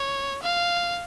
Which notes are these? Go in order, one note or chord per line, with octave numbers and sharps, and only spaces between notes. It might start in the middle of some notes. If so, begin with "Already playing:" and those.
Already playing: C#5
F5